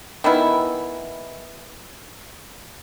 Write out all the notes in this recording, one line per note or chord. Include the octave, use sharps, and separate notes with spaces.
D#3 E3 B3 E4